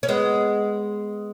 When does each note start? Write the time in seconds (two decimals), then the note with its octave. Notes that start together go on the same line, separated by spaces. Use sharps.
0.03 C#4
0.09 G#3 B3